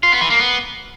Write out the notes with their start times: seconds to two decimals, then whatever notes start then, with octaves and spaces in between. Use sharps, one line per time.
0.03 F4
0.12 B3
0.21 E3
0.30 A#3
0.39 B3